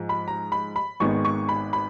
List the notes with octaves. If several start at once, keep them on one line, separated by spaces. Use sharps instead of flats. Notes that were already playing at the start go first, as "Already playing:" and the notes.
Already playing: G#2 F3 G#3
B5
A#5
B5
B5
G#1 G#2 D#3 G#3 B3 C#6
C#6
B5
B5